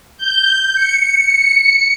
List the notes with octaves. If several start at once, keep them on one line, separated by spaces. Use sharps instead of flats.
G6
C#7